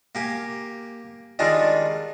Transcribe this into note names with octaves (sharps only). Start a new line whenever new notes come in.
A#3 G4 G#5
D#3 G3 G#3 D4 F4